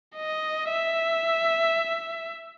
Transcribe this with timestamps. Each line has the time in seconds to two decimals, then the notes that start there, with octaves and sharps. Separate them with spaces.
0.16 D#5
0.70 E5